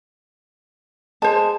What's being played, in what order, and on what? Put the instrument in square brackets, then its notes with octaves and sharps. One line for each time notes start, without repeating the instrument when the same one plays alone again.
[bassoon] G#3 [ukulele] C5 A5